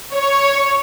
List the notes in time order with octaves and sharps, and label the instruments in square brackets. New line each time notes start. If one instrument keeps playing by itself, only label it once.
[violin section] C#5